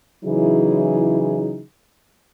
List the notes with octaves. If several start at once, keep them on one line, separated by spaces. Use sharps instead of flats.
C#3 E3 F#3 D#4 E4 G#4